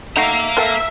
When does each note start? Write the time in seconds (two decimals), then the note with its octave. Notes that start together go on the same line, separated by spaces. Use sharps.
0.16 A3 D#4 F#4 E5 F5 A#5
0.57 A#3 A4 E5 G5